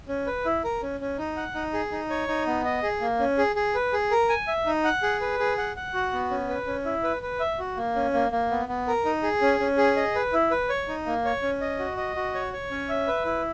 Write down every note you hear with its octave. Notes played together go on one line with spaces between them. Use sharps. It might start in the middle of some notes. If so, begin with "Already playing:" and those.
C#4
B4
E4
A#4
C#4
C#4
D#4
F#5
D#4
G#4
D#4
C#5
D#4
B3
D#5
G#4
A#3
C#4
G#4
G#4
B4
G#4
A#4
G#5
E5
D#4
F#5
G#4
B4
G#4
F#5
F#5
F#4
B3
C#4
B4
C#4
E4
B4
B4
E5
F#4
A#3
C#4
A#3
A#3
B3
B3
A#4
D#4
G#4
C#4
C#4
G#4
D#5
B4
E4
B4
C#5
D#4
A#3
C#5
C#4
D#5
F#4
D#5
F#4
C#5
C#5
C#4
E5
B4
E4